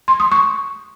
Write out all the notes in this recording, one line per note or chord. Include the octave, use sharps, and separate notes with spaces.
C6
D#6
C#6